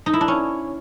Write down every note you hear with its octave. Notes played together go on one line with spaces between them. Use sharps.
D#4
E4
D4
C#4